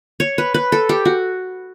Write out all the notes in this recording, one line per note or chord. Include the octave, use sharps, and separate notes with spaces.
C#5
B4
B4
A4
G4
F#4